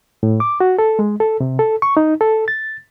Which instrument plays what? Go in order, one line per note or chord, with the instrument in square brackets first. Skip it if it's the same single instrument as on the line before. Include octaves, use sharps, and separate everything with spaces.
[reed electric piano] A2
D6
F#4
A4
G#3
A4
C3
A4
C#6
D#4
A4
A6